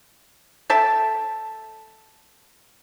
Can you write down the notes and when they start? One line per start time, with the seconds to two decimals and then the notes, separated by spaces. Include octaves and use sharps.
0.70 A4 E5 G5 A5